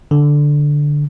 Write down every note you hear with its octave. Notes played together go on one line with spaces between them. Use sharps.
D3